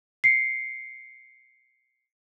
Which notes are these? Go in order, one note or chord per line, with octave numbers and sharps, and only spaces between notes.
C7 C#7